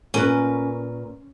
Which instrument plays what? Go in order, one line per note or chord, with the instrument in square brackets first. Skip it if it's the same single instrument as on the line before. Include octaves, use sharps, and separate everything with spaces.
[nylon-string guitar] A#2 A#4 B4 [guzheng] C#4